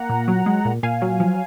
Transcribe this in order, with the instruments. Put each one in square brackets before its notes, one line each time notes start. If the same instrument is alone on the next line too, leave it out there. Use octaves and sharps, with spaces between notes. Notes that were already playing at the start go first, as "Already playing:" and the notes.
Already playing: [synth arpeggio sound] A#3 F#5 A#5
A#2
F#3
G#3
A#2
A#2 F5 G#5
F#3
F3